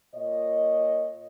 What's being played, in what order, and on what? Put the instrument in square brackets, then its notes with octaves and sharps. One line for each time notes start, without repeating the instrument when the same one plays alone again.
[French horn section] A#2 C#5 D#5